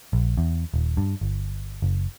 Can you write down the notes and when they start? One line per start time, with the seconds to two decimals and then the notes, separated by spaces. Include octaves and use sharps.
0.13 A#1
0.37 E2
0.74 D#1
0.97 G2
1.21 G1
1.82 F#1